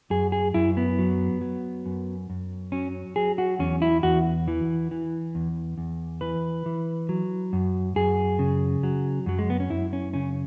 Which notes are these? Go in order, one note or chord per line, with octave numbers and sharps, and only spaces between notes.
F#2 G#4
G#4
F#2 E4
B3
F#3
F#3
F#2
F#2
F#3 C#4
F#3 G#4
F#4
E2 C#4
E4
E2 F#4
E3
E3
E2
E2
E3 B4
E3
F#3
F#2
F#2 G#4
C#3
F#3
F#2 F#3
G#3
B3
C#4
F#2 E4
C#4
C#3 C#4